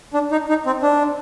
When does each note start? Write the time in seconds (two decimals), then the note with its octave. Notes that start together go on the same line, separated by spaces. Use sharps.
0.14 D4
0.32 D#4
0.49 D#4
0.66 C4
0.82 D4